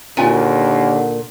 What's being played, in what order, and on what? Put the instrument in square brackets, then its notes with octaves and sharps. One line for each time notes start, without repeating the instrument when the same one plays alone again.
[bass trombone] D#2 [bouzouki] A#2 [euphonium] D3 [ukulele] F4 F#4 G#5